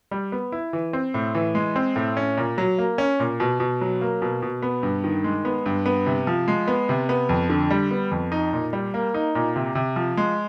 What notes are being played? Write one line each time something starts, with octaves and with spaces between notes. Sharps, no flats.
G3
B3
E4
E3
C4
A2
E3
G#3
C4
A2
C#4
A#2
F#3
A#3
C#4
A#2
B2
B2
F#3
A#3
B2
B2
B3
G2
D#3
G#3
B3
G2
B3
C3
F3
G#3
B3
C3
B3
F2
D3
G3
B3
F2
D#4
A#2
G3
A#3
D#4
A#2
C3
C3
F3
G#3